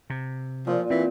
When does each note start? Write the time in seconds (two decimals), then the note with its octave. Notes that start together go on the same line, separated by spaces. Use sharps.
0.10 C3
0.67 A#2 F3
0.90 E3 C4